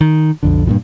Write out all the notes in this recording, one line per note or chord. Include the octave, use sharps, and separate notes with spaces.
D#3
B1 F2 D3
G2 A#2 E3